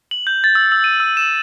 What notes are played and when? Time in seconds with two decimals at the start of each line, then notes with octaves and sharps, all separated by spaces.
0.11 F#7
0.27 G6
0.44 A6
0.55 E6
0.72 E6
0.84 D#7
1.00 E6
1.17 E7